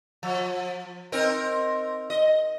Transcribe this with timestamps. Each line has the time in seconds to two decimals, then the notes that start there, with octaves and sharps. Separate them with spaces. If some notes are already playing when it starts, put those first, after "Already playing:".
0.23 F3
1.12 C4 D#4 A#4
2.10 D#5